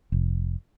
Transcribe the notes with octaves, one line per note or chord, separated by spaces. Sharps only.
F1